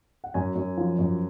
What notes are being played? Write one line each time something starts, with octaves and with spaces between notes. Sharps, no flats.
F#5
F#2 G#5
F#2
F3
F#2